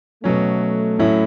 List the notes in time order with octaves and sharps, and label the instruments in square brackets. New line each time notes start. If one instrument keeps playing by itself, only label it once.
[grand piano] B2 F#3 C#4 [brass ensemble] A3
[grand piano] A2 F#3 C#4 E4